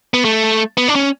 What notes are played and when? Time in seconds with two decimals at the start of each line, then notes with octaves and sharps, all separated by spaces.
0.14 B3
0.25 A3
0.77 B3
0.88 D4
0.95 C#4